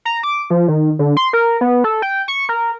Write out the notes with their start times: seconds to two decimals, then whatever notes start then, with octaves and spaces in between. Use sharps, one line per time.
0.05 A#5
0.23 D6
0.50 F3
0.68 D#3
0.99 D3
1.17 C6
1.33 A#4
1.61 B3
1.84 A4
2.02 G5
2.28 C#6
2.49 A#4